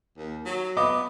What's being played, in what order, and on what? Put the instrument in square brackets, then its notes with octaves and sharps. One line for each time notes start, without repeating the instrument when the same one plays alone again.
[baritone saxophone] D#2
F#3
[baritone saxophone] B3 [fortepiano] D#5 D6